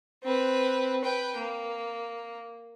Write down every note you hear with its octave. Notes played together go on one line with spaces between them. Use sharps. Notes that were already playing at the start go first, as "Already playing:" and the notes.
C4 B4
B4 G5
A#3